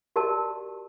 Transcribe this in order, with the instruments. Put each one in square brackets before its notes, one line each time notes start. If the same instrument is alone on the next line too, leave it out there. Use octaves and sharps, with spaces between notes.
[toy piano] F#4 G4 A#4 D5 A5